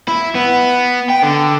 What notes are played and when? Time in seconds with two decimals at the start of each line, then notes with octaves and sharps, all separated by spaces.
0.08 E4
0.35 B3
1.09 G5
1.22 D3